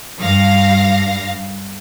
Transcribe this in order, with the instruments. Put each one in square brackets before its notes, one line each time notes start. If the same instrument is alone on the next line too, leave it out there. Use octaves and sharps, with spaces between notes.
[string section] G2 F5 A#6